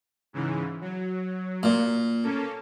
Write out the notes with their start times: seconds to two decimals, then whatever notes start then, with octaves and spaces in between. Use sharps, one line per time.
0.33 G#2 C#3 E3
0.81 F#3
1.63 A#2
2.23 A#3 C#4 A4